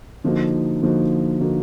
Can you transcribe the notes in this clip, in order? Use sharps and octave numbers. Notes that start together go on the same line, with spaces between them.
D3 F3 A#3 D#4 F#4
D3 F3 A#3 D#4 F#4
D3 F3 A#3 D#4 F#4